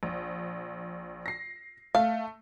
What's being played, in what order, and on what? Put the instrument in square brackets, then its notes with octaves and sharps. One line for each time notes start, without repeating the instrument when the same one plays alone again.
[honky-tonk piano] A#1
A#6 C7
[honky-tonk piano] A3 [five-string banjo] F5